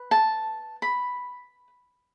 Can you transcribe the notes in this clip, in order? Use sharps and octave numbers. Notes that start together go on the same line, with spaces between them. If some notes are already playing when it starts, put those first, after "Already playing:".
Already playing: B4
A5
B5